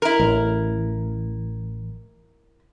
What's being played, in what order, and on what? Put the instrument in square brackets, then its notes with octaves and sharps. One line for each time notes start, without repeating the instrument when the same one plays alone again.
[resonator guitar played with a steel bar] E4 A#4
[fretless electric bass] A1